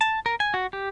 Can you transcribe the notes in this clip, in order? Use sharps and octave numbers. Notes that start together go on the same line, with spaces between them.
A5
A#4
G#5
F#4
G4